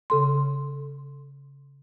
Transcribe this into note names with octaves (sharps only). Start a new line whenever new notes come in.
C#3 A4 C6